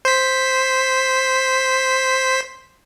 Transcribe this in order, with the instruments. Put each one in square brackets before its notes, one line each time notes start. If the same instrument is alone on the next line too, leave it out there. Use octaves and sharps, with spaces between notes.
[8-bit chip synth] C5 B6